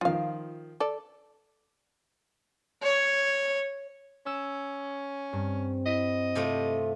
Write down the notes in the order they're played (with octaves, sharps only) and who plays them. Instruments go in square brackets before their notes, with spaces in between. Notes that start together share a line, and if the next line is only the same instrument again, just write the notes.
[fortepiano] D#3 F3 [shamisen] F4 F5
[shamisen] A4 D5
[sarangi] C#5
[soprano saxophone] C#4 [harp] E6
[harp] G2 [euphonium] C4
[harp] E4 B6 [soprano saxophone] D#5
[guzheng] C3 A3 F4